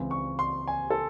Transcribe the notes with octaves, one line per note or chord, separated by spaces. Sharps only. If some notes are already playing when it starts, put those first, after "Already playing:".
Already playing: C#2 C#3 E3 C4
C#6
C6
G#5
A4